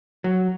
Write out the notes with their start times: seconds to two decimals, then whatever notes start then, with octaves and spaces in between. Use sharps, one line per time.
0.24 F#3